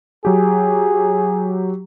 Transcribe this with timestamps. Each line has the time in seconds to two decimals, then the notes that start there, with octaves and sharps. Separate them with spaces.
0.25 F#3 G4 G#4